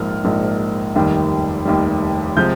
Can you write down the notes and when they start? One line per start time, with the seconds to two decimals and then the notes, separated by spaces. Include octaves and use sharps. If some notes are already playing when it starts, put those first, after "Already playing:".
Already playing: A#1 G#2 F3 A#3 F6
0.24 A#1 G#2 F3 A#3
0.96 F1 D#2 D#3 G3
1.65 F1 D#2 D#3 G3
2.36 C3 F3 G#3 G6